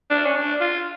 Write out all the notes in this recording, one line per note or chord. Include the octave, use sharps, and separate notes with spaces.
D4
C#4
D4
F4